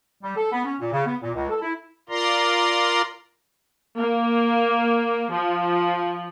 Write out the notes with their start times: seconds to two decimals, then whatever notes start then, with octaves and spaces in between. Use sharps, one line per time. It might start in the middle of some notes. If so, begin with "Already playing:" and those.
0.23 G3
0.37 A4
0.52 B3
0.65 C#4
0.80 A#2
0.93 C#3
1.06 B3
1.23 A#2
1.34 C#2
1.50 A4
1.62 E4
2.09 F4 A#4 D5 A#5 C6
3.96 A#3
5.32 F3